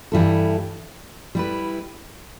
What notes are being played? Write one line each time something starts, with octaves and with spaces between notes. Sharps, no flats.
G2 E3 G3 E4 A4
G3 E4 B4